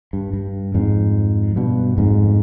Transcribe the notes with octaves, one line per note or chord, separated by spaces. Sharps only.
G2
G2
F2 G#2
G2 B2
F2 G#2